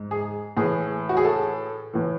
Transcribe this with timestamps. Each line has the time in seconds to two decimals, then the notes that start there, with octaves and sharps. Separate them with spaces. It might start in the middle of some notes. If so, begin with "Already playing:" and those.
Already playing: G#2
0.11 G#4
0.57 A2 E3 G#4
1.09 F#4
1.17 G#4
1.25 A4
1.93 A2 E3